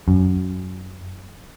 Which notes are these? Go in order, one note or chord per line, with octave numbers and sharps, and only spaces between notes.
F#2